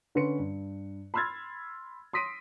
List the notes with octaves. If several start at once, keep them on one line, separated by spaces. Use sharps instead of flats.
D3 C#4 B4 C6 C#7
G2
B5 C6 E6 F6 G#6 A6
C6 D#6 A#6 B6 D7 D#7